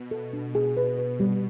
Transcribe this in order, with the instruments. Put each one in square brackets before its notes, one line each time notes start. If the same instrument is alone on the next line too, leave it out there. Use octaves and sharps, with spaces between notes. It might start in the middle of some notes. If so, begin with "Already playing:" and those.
Already playing: [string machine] B2
[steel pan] A4
D4
[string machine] B2 [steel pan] G#4
[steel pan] B4
B4
G3